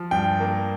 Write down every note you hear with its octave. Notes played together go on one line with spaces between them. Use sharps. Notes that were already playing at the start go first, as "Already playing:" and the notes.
Already playing: F3
G2 G5
A#3